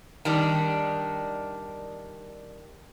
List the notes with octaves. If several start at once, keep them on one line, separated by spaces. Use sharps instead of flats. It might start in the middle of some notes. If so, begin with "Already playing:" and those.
D#3 G3 D4